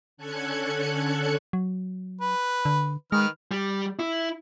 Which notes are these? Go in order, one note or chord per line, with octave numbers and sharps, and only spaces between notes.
D3 C#4 A4 F#6 G#6 C#7
F#3
B4
D3
D#3 G#3 B4 F6
G3
E4